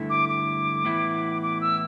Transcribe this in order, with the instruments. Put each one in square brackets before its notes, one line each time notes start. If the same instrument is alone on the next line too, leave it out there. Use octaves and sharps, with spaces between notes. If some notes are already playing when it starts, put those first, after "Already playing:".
Already playing: [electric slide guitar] G2 D3 A3 E4
[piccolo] D6
D6
[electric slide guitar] A2 E3 B3 E4
[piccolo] D6
E6